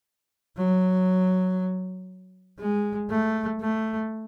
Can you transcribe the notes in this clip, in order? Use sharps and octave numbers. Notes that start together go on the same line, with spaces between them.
F#3
G#3
A3
A3